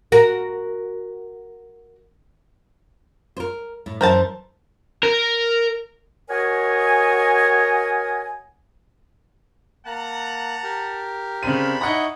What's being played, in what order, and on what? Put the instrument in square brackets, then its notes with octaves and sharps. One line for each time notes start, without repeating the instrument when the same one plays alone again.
[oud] F#4 A#4
[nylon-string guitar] A#4 C5
A2
[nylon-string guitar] F#2 E3 [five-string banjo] A#4 C5 A5
[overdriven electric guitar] A#4
[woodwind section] F#4 A#4 C#5 D#5 G#5
[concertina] A#3 F#6 [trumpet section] F#5 A5 A#5
[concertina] G4 A#4
[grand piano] C#3 C4 D#7 [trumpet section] D4 B5
[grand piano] D#4 F#5 A#5 [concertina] E4 C#5 D#5